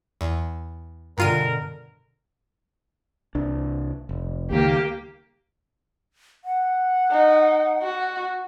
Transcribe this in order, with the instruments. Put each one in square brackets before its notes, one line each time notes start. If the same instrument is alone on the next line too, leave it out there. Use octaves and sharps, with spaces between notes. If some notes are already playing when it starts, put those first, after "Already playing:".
[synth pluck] E2
[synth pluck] G2 F4 D#7 [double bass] B2 D3 [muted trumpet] A#4
[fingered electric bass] C2 D4
F1
[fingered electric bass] C#2 D#3 [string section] A#3 G4
[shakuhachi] F#5
[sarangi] D#4
F#4